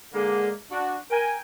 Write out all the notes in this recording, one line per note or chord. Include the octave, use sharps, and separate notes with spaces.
D3 G#3 A#3
D4 F#4
A#4 G5 G#5